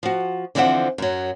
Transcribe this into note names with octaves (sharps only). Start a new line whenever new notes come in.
F3 F#4
D3 E3 F3 C4 E5 F#5
F#2 F#3